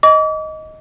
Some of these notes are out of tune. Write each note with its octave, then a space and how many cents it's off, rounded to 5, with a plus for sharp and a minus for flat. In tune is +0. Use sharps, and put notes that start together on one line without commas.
D#5 +5 D6 -40